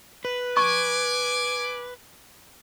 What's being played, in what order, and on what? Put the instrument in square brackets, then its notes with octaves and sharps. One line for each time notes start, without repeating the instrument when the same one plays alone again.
[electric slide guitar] B4
[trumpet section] G#5 D6 [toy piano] C#6